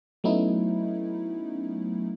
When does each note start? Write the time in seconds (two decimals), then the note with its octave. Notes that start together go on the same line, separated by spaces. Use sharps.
0.24 F#3 A3 B3 C#4 D#4 E4